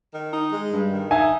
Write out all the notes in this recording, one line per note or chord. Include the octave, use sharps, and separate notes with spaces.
D#3
D#4
G#3
G2
D#3
D#4 E5 G#5